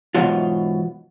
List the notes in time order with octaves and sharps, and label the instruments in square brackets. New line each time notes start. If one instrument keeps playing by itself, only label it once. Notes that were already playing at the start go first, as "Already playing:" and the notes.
[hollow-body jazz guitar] E2 G#2 B2 F#3 F4